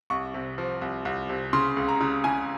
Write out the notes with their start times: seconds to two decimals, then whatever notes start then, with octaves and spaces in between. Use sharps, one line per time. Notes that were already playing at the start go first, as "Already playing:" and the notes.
0.10 C2 C#6
0.34 C3
0.58 F3
0.81 C2
1.05 C2
1.29 C3
1.53 C#3 C6
1.77 C#2
1.88 A#5
2.01 C#3
2.24 C#3 G#5